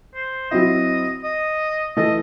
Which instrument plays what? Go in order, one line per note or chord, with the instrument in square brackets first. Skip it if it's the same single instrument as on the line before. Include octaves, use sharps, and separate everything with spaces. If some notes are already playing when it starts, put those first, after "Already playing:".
[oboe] C5
[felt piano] F#3 C4 E4 [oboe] D#5
[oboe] D#5
[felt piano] E3 A3 D#4 A4 [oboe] D#5